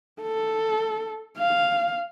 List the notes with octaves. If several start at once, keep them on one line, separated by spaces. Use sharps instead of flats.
A4
F5